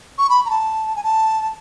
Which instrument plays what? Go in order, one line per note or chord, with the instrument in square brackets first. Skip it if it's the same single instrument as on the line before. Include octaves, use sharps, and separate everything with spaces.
[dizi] C#6
B5
A#5
A5
G#5
A5